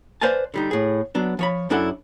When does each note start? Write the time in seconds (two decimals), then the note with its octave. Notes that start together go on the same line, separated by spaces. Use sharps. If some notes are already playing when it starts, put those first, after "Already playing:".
0.21 B4 C5 D5 F5 G#5 A5
0.54 D3 G3 D#4
0.71 A2 G#4
1.15 F#3 B3 D4
1.39 F3 C#5 B5
1.70 F#2 C#4 D4 E4 A4 F#5